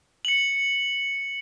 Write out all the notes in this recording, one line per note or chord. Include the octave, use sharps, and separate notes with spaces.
C#7 F#7